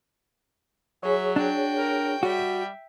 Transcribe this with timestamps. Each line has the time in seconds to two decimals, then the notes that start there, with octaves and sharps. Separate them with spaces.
1.03 F#3 G#4 C#5 E5
1.36 D4 F#4 G5
1.78 A#4
2.23 G3 F#4 E5 G5